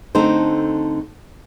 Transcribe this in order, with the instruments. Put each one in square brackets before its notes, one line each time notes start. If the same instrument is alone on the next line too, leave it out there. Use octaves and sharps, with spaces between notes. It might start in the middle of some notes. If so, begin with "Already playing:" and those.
[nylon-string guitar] D3 A3 C4 D#4 C5